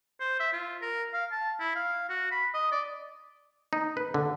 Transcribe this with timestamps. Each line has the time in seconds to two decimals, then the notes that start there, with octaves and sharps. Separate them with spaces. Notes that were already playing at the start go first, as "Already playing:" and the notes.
0.20 C5
0.40 E5
0.53 F4
0.82 A#4
1.13 F5
1.32 A5
1.59 E4
1.76 F5
2.09 F#4
2.31 B5
2.54 D#5
2.72 D5
3.73 D#4
3.97 B4
4.14 D3